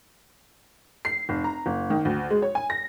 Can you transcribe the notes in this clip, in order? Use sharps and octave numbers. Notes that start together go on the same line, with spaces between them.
C7
F1
A#5
F#1
D#3
D2
G#3
C#5
G#5
A#6